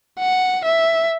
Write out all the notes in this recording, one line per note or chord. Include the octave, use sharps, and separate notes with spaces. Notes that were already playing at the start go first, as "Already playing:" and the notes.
F#5
E5